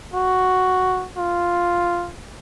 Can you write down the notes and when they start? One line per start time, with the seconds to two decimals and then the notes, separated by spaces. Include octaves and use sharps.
0.14 F#4
1.17 F4